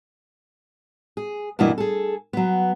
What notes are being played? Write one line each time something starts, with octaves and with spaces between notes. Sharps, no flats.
G#4
G2 B2 E3 A#3 E4 D#5
G#4 A4
F#3 B3